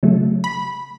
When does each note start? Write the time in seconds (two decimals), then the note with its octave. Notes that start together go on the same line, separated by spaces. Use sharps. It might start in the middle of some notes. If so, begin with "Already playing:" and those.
0.03 C#3 F#3 A3
0.44 B5